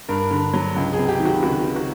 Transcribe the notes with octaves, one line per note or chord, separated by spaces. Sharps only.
G2 A#4
D3
F#3
C#2
G#4
C3
G4
D#3
F#4
C#2 F#4
C#3
F#4